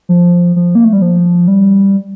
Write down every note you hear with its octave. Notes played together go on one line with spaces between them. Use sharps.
F3
F3
A#3
A3
G3
F3
G3